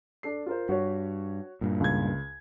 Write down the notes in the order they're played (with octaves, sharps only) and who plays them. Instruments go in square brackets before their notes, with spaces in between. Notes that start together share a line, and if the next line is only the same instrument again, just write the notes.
[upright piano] D4 A4 C7
F4 A#4 C5
[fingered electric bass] G2 [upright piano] F#4 C#5
[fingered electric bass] G2 A#2
[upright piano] C#2 G#6